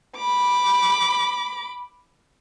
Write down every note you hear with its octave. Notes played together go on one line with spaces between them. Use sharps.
B5 D6